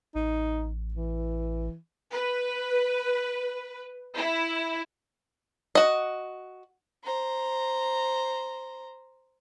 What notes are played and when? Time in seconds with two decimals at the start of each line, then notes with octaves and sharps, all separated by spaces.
0.15 A1 D#4
0.94 E3
2.12 B4
4.17 E4
5.75 F#4 D#5
7.04 C5 A#5